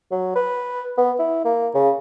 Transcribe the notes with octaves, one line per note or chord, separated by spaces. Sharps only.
F#3
B4
B3
E4
A#3
C#3